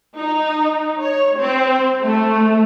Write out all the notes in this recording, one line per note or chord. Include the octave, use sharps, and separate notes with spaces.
D#4
C#5
C4
A3